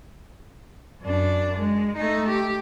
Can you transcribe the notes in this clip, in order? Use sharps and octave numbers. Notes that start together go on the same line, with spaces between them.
F#2 D4
G#3
A3 D#4
G4